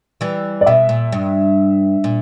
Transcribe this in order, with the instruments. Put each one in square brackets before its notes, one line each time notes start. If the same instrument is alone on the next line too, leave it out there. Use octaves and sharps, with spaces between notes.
[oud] E3 G3
[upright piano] D5
[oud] B2 [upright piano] E5
[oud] A#2
G2
A#2